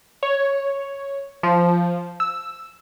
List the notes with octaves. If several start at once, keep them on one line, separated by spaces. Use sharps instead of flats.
C#5
F3
E6